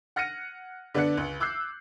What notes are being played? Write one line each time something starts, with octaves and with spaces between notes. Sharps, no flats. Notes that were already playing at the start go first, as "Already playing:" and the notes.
F#5 F6 A#6 C#7 D#7
D3 B3 D4 D5 F#6 C#7
C#2
D6 E6 F#6 G6 C7